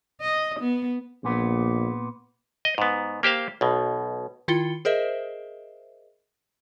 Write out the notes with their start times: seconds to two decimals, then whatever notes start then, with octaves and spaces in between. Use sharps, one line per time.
0.21 D#5
0.59 B3
1.24 A#1 A#2 B3
2.65 D#5
2.78 G#2 B3
3.23 A#3 G4 C5 F5
3.61 B1 B2
4.48 D#3 E4 F4 G5 C#7 G7
4.85 G#4 A#4 C5 D#5 E5